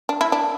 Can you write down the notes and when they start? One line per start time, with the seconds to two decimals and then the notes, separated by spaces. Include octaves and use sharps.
0.09 D4
0.21 E4
0.32 D4